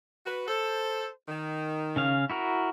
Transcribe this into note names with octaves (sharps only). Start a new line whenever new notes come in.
F#4 B4
A4 C5
D#3
C#3 C#4 F5
E4 F#4 A#4